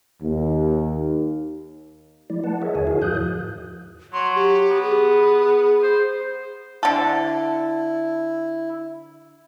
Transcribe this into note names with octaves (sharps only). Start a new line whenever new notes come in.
D#2
F3 A3 E4 D5
B4 F#5 A5
G#4 A#4 C#5 D#5 E5
D#2 D3 G#4 C#5 G#5
E4 F#4 G#4 A#4 F5
E2 G#2 F3 D#6 F#6 G6
F#3 C6
G4
B3
G#4
C5
D3 E4 A4